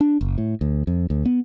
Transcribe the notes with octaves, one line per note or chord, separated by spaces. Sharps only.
D4
F#1
A2
D2
F2
D2
B3